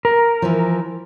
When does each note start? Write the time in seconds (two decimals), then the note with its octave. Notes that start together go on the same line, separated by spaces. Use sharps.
0.05 A#4
0.42 E3 F3